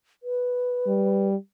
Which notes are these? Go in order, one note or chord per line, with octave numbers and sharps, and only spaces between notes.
B4
G3